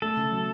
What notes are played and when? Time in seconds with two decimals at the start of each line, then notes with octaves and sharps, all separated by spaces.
0.02 A3 A4
0.16 C#3
0.32 F#3